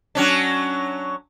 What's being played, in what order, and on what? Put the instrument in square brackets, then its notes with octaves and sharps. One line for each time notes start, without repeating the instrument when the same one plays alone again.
[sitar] F#3 C#4 D4